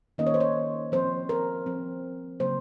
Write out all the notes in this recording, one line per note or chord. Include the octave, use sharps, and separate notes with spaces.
D#3 A#3 C#4 D#5
C#5
C5
C#5
F3 C4 C5
A#4
F3 C4
C#3 F#3 A#3 C5